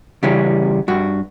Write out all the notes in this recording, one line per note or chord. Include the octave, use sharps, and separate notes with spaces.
C#3 E3 G3 C#4
G2 F#4